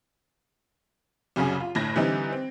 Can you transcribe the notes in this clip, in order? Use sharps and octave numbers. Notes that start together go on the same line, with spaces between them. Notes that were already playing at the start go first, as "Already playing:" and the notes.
C2 F#2 C#3 C#4 G#4
F4
G1 A2 G#6 A#6
D3 E3 G3 C4 D#4
C4